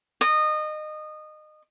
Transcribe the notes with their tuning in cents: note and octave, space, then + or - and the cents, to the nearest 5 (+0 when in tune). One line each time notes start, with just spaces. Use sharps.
D#5 -25